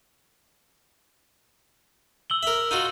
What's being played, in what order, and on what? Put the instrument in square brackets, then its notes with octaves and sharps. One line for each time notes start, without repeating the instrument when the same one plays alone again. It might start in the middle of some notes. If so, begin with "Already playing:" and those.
[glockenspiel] E6 F#7 G7
[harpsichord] A#4 E5
D#4 F4 F#4